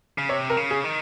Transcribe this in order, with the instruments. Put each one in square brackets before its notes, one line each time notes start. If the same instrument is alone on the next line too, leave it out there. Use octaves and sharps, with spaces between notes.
[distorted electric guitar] C#3
[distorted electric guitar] C3 [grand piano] C#5
[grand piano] A#4
[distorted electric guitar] C#3
[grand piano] G#4
[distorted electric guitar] D#3